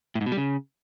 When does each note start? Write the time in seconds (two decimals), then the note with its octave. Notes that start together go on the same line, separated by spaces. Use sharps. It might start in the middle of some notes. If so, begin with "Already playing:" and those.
0.15 A2
0.21 G#2
0.26 B2
0.32 G3
0.37 C#3